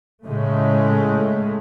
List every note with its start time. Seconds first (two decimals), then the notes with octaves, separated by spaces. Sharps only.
0.25 A2 C#3 G#3 A3